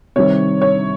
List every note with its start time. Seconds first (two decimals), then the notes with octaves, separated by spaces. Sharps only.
0.16 C3 D#3 G3 C4 C#5
0.61 C#5